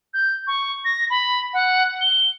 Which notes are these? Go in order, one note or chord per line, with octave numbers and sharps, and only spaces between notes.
G6
C#6
A#6
B5
F#5
G7